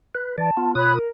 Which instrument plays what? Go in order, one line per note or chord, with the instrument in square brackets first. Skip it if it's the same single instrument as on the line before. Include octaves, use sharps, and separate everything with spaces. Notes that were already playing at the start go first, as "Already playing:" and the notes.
[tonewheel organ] B4
[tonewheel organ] E3 D5 [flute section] A5
[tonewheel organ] B3 F4
[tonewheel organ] B2 F4 D#6 [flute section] C#5 B5 F#6
[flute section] A#4